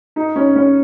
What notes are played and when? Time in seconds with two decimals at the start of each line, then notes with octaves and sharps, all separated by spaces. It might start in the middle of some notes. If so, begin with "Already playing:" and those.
0.16 D#4
0.36 C#4
0.56 C#4